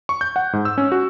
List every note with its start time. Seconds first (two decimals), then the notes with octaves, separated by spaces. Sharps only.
0.09 C#6
0.21 G6
0.36 F#5
0.53 G#2
0.65 E6
0.78 C#4
0.92 F#4